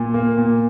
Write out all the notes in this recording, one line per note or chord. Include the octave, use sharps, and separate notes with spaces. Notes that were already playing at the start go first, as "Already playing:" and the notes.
Already playing: A#2
A#3
A#2